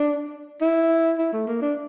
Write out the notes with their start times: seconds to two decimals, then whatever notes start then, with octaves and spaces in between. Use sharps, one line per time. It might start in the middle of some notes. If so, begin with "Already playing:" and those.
Already playing: D4
0.61 E4
1.19 E4
1.33 A3
1.48 A#3
1.62 D4